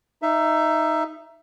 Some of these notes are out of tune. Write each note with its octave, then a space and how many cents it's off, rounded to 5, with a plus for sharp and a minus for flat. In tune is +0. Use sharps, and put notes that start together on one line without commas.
D#4 +0 E5 +15